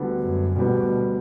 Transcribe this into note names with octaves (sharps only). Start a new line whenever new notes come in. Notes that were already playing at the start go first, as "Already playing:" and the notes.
Already playing: D2 D3 G3 B3
F#2
D2 B2 D3 G3 B3